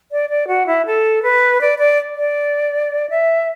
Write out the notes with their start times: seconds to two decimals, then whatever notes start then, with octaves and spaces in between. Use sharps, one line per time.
0.12 D5
0.30 D5
0.48 F#4
0.67 E4
0.86 A4
1.23 B4
1.61 D5
1.79 D5
2.17 D5
3.10 E5